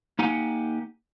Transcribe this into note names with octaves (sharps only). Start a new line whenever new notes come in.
A#3 D#4 G4 F#5 G#5